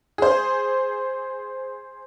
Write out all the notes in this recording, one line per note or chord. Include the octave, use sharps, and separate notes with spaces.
G#4 C5